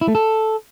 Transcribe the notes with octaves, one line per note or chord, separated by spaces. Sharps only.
E4
A3
A4